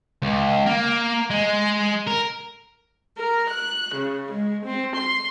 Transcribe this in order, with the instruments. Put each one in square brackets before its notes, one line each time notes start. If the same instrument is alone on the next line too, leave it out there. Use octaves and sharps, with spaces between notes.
[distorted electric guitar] C#2
A#3
G#3
A#4
[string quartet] A#4
F#6
C#3
G#3
C4
C6